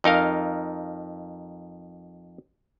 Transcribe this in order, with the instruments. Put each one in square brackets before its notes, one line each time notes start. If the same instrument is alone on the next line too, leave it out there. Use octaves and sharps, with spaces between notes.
[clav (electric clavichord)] F2 D#4 A#4 F5